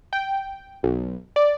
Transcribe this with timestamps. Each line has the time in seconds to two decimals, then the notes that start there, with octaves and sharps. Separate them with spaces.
0.13 G5
0.83 B1
1.36 D5